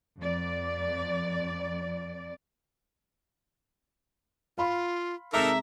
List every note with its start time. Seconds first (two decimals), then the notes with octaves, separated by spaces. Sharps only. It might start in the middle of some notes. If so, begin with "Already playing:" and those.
0.19 F2 D5
4.58 F4 F5 B5 C6
5.33 C3 G#3 D#4 A4 A#4 E5 A#5 D6